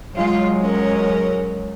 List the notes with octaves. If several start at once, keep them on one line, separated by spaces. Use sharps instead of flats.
F#3 G#3 F4
C#4 A#4